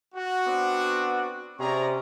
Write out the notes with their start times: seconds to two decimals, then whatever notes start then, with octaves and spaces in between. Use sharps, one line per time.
0.14 F#4
0.46 B3 C4 D4
1.58 C3 C#4 G#4 D5 A#5